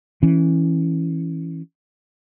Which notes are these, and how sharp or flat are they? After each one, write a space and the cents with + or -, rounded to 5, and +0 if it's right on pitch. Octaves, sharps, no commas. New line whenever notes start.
E3 -5 C#4 -10